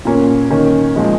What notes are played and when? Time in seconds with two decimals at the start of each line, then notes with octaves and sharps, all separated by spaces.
0.05 A#2 A#3 C#4
0.50 D#3 A#3 C#4
0.96 A#2 F3 G#3